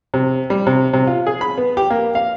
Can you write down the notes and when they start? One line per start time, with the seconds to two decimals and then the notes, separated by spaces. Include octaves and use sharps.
0.14 C3
0.50 G3
0.67 C3
0.93 C3
1.08 F4
1.27 G#4
1.41 B5
1.58 B3
1.77 G4
1.90 A#3
2.15 F5